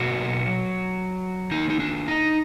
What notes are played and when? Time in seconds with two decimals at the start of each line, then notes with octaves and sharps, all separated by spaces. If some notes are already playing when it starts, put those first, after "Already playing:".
Already playing: B2 F#3 A#3 F#4
1.51 D#3 A#3 D#4
1.70 D#4
1.80 D4
2.08 D#4